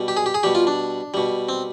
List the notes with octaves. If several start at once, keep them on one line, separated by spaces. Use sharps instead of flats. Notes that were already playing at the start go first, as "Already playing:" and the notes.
Already playing: B2 G3
G4
G#4
G4
G#4
B2 G3 G4
F4
D4
B2 G3
C4